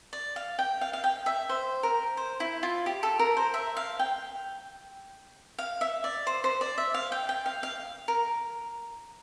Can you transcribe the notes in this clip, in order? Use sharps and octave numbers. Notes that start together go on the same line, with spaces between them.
D5
F5
G5
F5
F5
G5
E5
C5
A#4
C5
E4
F4
G4
A4
A#4
C5
E5
F5
G5
F5
E5
D5
C5
C5
D5
E5
F5
G5
G5
F5
F5
A#4